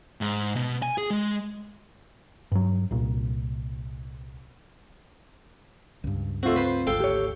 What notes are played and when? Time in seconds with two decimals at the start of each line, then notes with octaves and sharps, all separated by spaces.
0.21 G#2
0.56 B2
0.82 G#5
0.98 G#4
1.10 G#3
2.52 G2 F#3
2.91 C2 A#2
6.04 C#2 G2
6.43 A3 C4 F4 F#4
6.56 B4 C5
6.87 G#1 D2 A4 F5 G5
7.00 G4 C#5